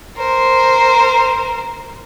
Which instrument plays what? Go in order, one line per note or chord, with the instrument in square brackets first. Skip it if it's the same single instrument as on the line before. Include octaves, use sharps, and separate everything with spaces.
[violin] A#4 C5